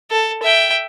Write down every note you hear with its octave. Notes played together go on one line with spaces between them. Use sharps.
A4
E5 G5